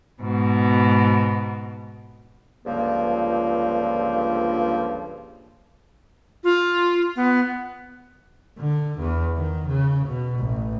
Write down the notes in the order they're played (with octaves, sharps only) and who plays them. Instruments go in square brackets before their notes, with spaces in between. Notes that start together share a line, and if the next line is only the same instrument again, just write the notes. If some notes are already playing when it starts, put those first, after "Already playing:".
[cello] G#2 B2
[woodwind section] C#2 G2 D3 F3 A#3
[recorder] F4
B3
[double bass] D3
E2
D#3
C#3
B2
A1